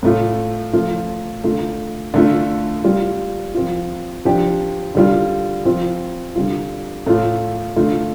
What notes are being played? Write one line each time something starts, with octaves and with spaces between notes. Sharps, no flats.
A2 A3 F4
F3 A3 F4
D3 A3 F4
D3 A3 F4
G3 F4
F3 C4 F4
F3 D4 G4
D3 G3 F4
F3 C4 F4
D3 G3 F4
A2 A3 F4
D3 A3 F4